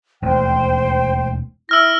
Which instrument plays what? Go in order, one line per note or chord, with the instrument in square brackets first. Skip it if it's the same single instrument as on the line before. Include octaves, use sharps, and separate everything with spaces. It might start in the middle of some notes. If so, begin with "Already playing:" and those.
[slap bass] E1 D#2 A3 [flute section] C5 G5
[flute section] E4 [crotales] E6 F6 A#6